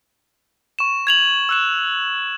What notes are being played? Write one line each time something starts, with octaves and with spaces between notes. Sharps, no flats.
C#6 E7
G#6 F7 F#7
E6 F#6 E7